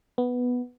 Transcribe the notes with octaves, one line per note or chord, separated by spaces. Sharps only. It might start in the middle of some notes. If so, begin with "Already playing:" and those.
B3